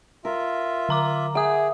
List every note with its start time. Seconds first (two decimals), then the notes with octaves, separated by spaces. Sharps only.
0.25 F4 A#4 E5
0.89 D3 A#5 D6
1.35 G#4 E5 F#5 D#6